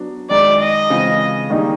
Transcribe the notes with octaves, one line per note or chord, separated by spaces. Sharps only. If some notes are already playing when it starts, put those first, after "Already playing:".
Already playing: F#3 B3 D4
F#2 D#3 G#3 D5
D#5
C#3 E3 G#3 C4 F4
D#3 G3 A#3 D#4 G#4